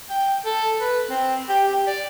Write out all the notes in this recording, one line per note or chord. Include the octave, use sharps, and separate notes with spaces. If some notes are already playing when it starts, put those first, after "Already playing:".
G5
A4
B4
C4
G4
G4
D5